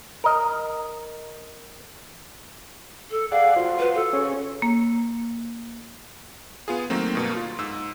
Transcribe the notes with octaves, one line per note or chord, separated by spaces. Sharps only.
A#4 D#5
A4
G#4 D5 F5 F#5
F4 F#4 C5
B4
A4
C#4 G#4 C#5
A#3
B3 F4 G#4
D#3 F#3 A3 A#3 C4
G2 B2 A#3
F4
G#2 E6